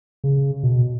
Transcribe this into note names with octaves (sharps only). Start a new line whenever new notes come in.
C#3
B2